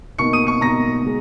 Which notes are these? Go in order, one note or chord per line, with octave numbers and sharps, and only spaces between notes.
B2 A#3 D#4 C#6 C#7
D#6 D#7
C#6 C#7
B2 A#3 D#4 A#5 A#6
B2 G#3